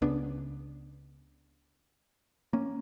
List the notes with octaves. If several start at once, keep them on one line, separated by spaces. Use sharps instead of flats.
C#2 C#3 B3 D4
A#3 C#4